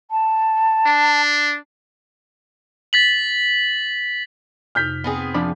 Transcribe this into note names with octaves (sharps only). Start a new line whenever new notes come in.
A5
D4
A6 B6 F#7
F2 C3 D#4 F6 G6 B6
B3 C4 G#4 G5
F3 D4 B5